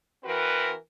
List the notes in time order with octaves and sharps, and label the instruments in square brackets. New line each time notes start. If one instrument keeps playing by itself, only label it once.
[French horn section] E3 C4 F#4 A#4 B4